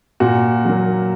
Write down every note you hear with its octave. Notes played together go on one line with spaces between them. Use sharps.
A#2 F#4
F#3 A#3